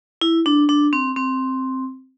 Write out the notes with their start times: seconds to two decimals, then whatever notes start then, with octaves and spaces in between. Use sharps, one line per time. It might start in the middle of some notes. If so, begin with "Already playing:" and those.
0.21 E4
0.46 D4
0.69 D4
0.93 C4
1.17 C4